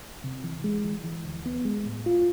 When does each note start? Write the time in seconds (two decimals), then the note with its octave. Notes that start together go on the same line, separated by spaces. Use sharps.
0.24 C3
0.44 E3
0.64 G#3
0.84 E3
1.04 E3
1.25 D2
1.46 B3
1.65 G#3
1.86 A2
2.06 F4